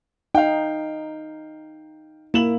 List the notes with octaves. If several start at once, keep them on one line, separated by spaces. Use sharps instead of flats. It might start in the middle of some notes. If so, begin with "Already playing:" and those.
D#4 F5 G5
A#3 E4 E7 F#7